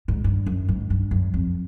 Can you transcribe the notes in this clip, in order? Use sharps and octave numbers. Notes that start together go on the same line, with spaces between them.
G#2
G2
F#2
G#2
G2
F#2
F2